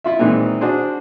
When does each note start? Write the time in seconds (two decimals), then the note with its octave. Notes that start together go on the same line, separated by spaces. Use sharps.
0.04 E4 F4 E5
0.19 A#2 D#3 E3 G#3 C4 D#4
0.61 D4 F#4 G#4 C5